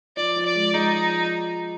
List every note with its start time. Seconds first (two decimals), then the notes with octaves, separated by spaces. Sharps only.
0.17 F3 D5
0.36 F3
0.45 D5
0.55 G#3
0.74 G#3 D#4
0.94 F3